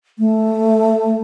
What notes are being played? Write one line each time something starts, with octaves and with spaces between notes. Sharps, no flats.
A3